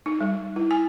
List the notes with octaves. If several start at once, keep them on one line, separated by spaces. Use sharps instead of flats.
D#4
G3
E4
G#5